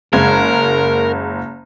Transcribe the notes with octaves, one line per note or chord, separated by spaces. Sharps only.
F#1 G#3 A#4 G#6